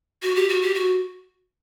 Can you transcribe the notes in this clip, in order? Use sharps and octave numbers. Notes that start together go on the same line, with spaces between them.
F#4
G4
F#4
G4
F#4